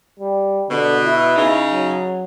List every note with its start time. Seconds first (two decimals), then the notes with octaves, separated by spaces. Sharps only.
0.19 G3
0.70 B2 D3
1.06 E4
1.36 C#3 D#4
1.71 F#3